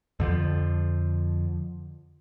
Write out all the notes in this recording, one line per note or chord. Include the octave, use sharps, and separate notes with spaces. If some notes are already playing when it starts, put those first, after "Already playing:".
F2 D3 F3